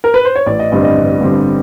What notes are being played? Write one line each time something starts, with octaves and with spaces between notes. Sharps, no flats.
A#4
B4
C5
C#5
A1 D5
D#5
G2 D3 G3 C4 D#5
D5
D#5
A1
G2 D3 G3 C4